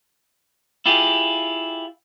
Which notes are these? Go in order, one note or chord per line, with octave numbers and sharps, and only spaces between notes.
E4 F4 G4 G#4